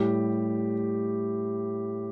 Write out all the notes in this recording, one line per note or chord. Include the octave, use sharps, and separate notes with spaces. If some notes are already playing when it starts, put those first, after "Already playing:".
Already playing: A2 G3 G4